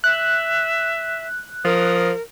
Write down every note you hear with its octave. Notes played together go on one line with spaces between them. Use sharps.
E5 F#6
F3 A#4 D#6